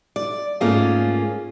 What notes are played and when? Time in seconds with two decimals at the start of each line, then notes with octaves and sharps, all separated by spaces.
0.16 D5
0.61 G#2 A3 A#3 C#4 F4 G#4